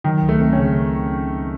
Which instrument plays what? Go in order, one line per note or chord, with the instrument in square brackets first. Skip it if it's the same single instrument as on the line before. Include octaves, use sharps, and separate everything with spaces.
[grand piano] D#3 [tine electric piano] F#3
[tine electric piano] C#2
[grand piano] A3
[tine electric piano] C4
[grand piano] C#4
[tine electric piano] C#3